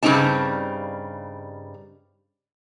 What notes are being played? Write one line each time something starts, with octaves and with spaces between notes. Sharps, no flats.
G2 C#3 G3 C4 D#4 A5